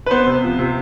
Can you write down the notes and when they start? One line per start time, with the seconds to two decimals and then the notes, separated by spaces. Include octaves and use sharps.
0.06 B4
0.11 B3 C5
0.27 C3
0.43 F3
0.59 C3